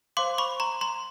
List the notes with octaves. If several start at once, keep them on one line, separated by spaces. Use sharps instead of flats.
C5 F5 C6 D6
B5 C#6
A#5 C6
A#5 C6